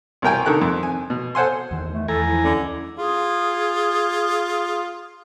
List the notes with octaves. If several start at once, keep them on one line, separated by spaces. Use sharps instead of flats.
C2 B2 A#4 G5 G#5
D3 D#3 A4 A#4 F#6
F2
G#5
B2
A4 C5 F#5 G#5 C6
E2 D#3
A3
E2 A4 G#5 A#5
F3 E4
D2 D3 A3 C#4
F4 G#4